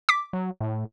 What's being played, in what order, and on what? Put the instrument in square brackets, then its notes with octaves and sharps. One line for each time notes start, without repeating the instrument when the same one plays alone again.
[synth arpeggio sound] D6 B6
[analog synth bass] F#3
A2